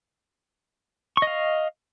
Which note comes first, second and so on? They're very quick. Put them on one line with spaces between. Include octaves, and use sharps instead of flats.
C#6 D#5 F5